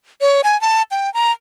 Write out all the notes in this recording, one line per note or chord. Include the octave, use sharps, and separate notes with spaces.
C#5
G#5
A5
G5
A#5